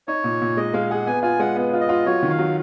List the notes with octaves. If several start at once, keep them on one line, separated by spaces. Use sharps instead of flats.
D#4 C#5
A#2
A#2
G#3 D#5
G#3 F5
G#4 F#5
B3 G#5
F4 G#5
G#3 F#5
B3
F4
D#5
F4
F#3 C#5
D#3
F5
F#3